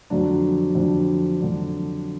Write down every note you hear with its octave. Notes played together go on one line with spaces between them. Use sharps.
F2 D3 F#3 D4
F2 D3 F#3 D4
F2 D3 F#3 D4